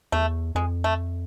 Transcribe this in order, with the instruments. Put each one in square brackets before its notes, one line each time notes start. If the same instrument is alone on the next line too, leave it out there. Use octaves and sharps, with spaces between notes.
[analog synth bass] E2 [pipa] A3
[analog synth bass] F2 [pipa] G#3
[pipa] A3